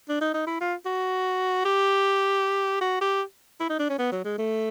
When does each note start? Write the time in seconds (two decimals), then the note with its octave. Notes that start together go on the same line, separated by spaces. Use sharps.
0.09 D4
0.21 D#4
0.34 D#4
0.47 E4
0.61 F4
0.86 F#4
1.65 G4
2.81 F#4
3.01 G4
3.60 E4
3.69 D#4
3.79 D4
3.90 C#4
3.99 B3
4.12 F#3
4.25 G#3
4.38 A3